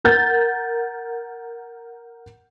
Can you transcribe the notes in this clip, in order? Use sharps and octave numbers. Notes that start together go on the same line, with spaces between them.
A#4 F#5 G6 A6